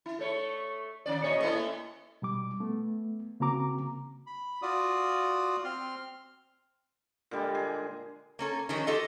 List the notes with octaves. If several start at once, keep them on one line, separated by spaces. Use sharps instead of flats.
E4
A3 C#5
D#3 C#4 D5
A#2 C#5 D#5
A3 A#3 E4
B2 G3 D6
A3 B3
C#3 A#3 C4 F#4 A#5 D6
B5
F4 F#4 D5 D#6
C4 C6 F6
A#2 D3 G3 G#3
G#4
A#3 C#4 A4
D#3 F3 G3 G#3 C#4
F4 G4 A4 D#5